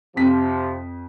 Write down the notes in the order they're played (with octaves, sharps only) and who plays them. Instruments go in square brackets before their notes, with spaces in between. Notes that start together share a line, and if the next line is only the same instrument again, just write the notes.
[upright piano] F2 B6 [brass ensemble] C3 F3